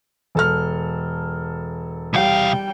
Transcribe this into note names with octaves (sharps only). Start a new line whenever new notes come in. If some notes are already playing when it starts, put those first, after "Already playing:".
E1 A4 F6
C2 G3 F5 G5